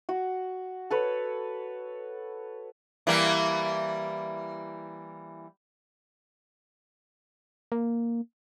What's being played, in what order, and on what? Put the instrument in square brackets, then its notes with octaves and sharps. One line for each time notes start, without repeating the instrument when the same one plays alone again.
[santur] F#4
A4 B4 C#5
[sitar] E3 G3 A#3
[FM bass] A#3